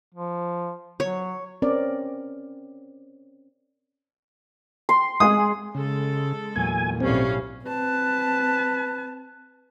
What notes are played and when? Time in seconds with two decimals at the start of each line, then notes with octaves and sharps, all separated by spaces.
0.14 F3
1.00 F#3 C#5
1.62 C4 C#4 A#4 D5
4.89 C6
5.20 G#3 G#4 D#6
5.75 C#3 G#3 A4
6.56 E2 A#2 F#3 G#5
7.01 B1 A2 G3 C4 C#4 F5
7.65 C4 B4 A5